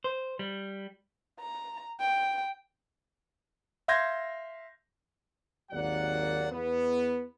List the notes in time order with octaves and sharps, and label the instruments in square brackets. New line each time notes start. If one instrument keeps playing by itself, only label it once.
[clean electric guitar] C5
G3
[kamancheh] A#5
G5
[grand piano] E5 F5 C6 G6 G#6 A#6
[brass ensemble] G#1 D#2 F#3 A#3 D5 F#5
E2 B3